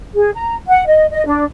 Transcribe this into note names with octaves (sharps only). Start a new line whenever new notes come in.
G#4
A#5
F#5
D#5
D#5
D4